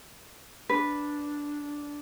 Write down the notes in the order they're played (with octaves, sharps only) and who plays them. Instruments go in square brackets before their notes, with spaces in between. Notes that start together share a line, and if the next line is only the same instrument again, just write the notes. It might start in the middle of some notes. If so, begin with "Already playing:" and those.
[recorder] D4 [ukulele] B4